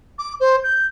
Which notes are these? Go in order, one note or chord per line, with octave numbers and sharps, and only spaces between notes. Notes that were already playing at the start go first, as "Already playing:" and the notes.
D6
C5
G6